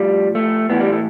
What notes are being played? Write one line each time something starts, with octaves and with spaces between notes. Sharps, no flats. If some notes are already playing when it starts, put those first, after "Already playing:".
Already playing: A2 F3 G3
A3
A2 E3 B3
G3
A3